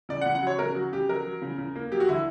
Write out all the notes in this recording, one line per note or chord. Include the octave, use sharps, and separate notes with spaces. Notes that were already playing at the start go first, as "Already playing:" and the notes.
C#3 D5
F#5
C#3
F#5
F#3 C#5
C#3 A#4
F#3 F#4
C#3 G4
F#3 A#4
F#3
C#3
C#3
A#3
F#3 G4
F#4
D3 E4